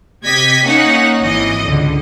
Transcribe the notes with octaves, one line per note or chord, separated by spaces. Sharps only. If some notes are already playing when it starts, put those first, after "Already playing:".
C3 G4 D#5 G#6 B6
A#3 C#4 D#4 C#5 F#5
G#1 E3 D#5
C#2 D3